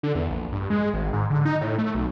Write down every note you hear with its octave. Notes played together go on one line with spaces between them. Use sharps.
D3
E2
A#1
G2
G#3
G#1
G#2
D3
D#4
A2
A3
B1